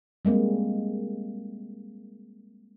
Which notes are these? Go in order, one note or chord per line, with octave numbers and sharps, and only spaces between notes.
G3 G#3 A#3 C4